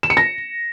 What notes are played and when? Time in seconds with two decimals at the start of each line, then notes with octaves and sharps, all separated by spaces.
0.03 E7
0.10 C#7
0.17 A#6